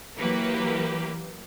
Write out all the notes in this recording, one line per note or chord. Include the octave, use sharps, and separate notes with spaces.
E3 F#3 A#3 G4 A#4 B4